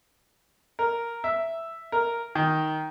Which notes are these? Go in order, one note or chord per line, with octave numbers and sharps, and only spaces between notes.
A#4
E5
A#4
D#3